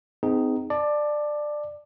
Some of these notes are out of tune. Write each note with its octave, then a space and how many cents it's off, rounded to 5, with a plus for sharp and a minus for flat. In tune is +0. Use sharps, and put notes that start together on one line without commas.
C4 -40 D#4 +0 G#4 +0
D5 +15 A5 -10